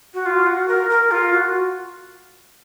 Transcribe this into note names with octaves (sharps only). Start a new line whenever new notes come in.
F#4
F4
F#4
A#4
A#4
F4
F#4